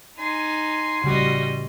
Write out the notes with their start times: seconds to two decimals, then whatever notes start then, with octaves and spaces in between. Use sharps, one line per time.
0.19 D#4 G#5 C6
1.04 A1 C#3 G3 F#4 D#5